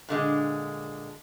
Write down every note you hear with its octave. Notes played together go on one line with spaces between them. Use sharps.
A#2 D3 G#3